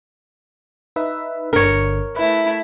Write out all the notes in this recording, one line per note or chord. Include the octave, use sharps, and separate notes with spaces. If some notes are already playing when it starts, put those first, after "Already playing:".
D#4 B4 E5
G1 D3 A#4 C#5
A3 E4 B4